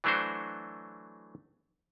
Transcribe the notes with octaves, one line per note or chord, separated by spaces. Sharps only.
E3 F#3 A3 D4 F#4 C5